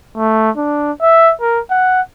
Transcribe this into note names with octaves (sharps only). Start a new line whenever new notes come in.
A3
D4
E5
A#4
F#5